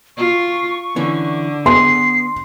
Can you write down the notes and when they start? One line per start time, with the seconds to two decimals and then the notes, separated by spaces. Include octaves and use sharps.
0.17 F4 C#6
0.96 D3 E3 C#4
1.66 B3 G#4 C6 C7